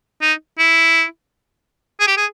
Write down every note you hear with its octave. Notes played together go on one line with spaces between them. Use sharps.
D#4
E4
G#4
G4
G#4